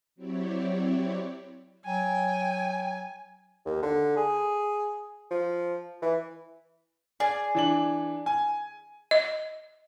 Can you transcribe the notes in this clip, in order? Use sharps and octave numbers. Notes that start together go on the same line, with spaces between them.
F#3 C4 E4 G4 C#5 D5
F#3 G5 G#5
D#2
D3
G#4
F3
E3
G#4 D5
E3 D4 F#7
G#5
D#5